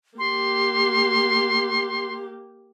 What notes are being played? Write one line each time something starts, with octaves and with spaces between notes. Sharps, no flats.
A#3 G4 C6